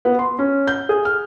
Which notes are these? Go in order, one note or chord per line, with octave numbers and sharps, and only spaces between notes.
B3
C6
C#4
G6
G#4
F6